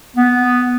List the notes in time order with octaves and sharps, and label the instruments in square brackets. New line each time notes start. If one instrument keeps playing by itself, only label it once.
[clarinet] B3